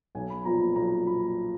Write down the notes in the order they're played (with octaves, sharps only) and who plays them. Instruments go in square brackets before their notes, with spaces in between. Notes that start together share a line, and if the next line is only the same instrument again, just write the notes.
[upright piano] B1 G#5
B5
A#2 F3 B3 A#5
B5
B1 A#5
A#2 F3 B3 B5